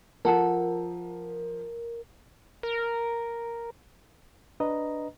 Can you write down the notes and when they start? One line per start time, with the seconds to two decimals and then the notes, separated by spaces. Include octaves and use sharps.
0.25 F3 A4 A#4 F#5 A5
2.63 A#4
4.60 D4 B4 D#5 A#5